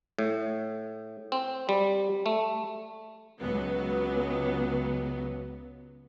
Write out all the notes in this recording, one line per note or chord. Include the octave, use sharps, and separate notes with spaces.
A2
C4
G3
A3
C#2 F#3 B3